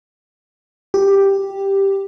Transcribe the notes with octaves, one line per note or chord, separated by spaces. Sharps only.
G4